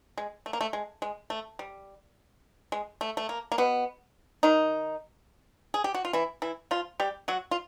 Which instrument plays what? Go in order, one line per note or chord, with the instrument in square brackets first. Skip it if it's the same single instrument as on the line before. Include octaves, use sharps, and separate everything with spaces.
[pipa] G#3
A3
A#3
A3
G#3
G#3
A3
G3
G#3
A3
A3
A#3
A#3
B2 B3
D#3 D#4
G#4
G4
F#4
F4
E3 E4
E3 E4
F3 F4
G3 G4
F#3 F#4
F4